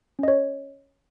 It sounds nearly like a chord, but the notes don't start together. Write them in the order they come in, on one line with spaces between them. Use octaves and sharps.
C#4 D#5 C#5